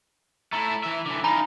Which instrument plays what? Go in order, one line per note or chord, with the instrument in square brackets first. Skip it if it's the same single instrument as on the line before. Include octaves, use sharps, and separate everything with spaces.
[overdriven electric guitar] A3 E4 [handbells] A#5
[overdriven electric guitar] E3 E5
D3 E3
[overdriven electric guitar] D#4 F4 [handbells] G#5 A#5 B5